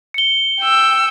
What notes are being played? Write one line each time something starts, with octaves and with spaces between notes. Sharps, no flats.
C#7 G7
G5 E6